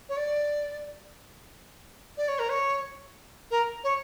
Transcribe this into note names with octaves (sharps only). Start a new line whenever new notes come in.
C#5
D5
D5
C#5
A#4
C#5
A#4
C#5